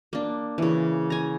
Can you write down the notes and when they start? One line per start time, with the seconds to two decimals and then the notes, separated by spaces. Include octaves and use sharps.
0.13 A#3 D4
0.58 C#3 E3
1.10 G#5 A#5